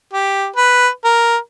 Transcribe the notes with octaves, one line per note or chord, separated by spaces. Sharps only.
G4
B4
A#4